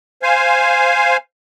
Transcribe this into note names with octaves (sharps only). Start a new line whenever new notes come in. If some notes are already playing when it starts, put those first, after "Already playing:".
C5 F5 G#5